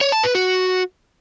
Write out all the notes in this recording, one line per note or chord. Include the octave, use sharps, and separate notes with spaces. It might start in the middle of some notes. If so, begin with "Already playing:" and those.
C#5
A5
B4
F#4